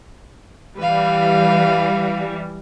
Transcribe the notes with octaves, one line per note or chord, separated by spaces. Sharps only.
E3 G3 B4 F5